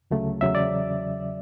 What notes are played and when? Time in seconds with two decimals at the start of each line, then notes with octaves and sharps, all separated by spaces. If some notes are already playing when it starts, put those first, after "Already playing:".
0.11 D2 C#3 F#3 A3
0.41 E2 C#3 F#3 E5
0.55 D5